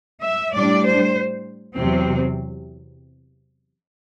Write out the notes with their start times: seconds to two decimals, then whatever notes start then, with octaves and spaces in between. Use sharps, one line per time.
0.23 E5
0.54 A2 G3 D4 D5
0.85 C5
1.77 E2 C3 F#3 C4